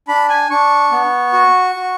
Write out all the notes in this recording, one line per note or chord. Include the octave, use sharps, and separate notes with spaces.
D4 B5
G#5
D4 C#6
B3
F#4
F#4